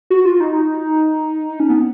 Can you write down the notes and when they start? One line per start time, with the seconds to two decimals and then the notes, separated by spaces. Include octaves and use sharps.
0.10 F#4
0.25 F4
0.40 D#4
1.60 C#4
1.69 B3